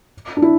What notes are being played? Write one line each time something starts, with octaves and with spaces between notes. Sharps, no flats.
D4
E4